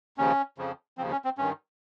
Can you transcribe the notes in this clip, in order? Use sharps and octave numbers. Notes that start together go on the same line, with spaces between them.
D#2 C#3 F3 C#4
F2 C#3 F3
D#2 C#3 F3 C4
C#4
C4
G2 D#3 C#4